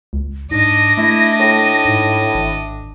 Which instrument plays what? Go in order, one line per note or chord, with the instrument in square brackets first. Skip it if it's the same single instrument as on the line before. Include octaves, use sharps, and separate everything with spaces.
[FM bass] C#2
[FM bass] G#2 [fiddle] D4 D#5 [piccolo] A#6
[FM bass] A3 [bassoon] E4
[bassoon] A2
[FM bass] G#2
G#1